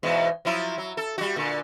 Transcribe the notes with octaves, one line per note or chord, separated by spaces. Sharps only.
E2 G#2 B2
F3 F#3 E4
F#3
A4
G3 F#4
A#2 D3